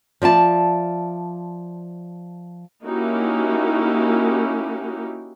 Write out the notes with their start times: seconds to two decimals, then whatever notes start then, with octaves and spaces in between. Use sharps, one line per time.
0.22 F3 D5 E5 A5
2.84 A#3 C#4 D#4 E4 F#4 G4